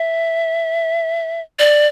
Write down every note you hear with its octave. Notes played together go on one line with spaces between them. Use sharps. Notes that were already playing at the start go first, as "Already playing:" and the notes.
Already playing: E5
D5